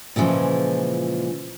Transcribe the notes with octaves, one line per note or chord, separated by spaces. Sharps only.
A#2 C#3 E3 F3 G#3